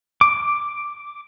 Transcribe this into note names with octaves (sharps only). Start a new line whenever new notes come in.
D6